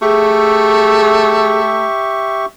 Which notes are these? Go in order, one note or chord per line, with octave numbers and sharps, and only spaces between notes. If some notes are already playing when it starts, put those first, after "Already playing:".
A3 G4 G#4 E5 C#6